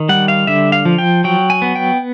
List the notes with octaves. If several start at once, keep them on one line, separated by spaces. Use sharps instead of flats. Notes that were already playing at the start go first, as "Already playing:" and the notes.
Already playing: D#3
G3 F#5
F5
D3 E5
F5
F3
G5
F#3 G5
G#5
B3
G5